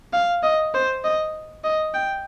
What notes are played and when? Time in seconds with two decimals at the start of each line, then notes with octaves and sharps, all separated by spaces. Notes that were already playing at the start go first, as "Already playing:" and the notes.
0.13 F5
0.43 D#5
0.74 C5
1.04 D#5
1.64 D#5
1.94 G5